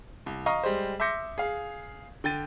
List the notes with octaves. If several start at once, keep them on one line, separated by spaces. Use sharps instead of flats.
C2
D#5 F5 A#5 C#6 D#6
G3 G#3 C5
E5 C6 D6 G6 A#6 C#7
G#4 F5
D3 G5 A6 D#7